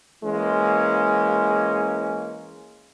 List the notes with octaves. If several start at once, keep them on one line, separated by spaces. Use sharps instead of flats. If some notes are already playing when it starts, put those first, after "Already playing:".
E3 G#3 A#3 C#4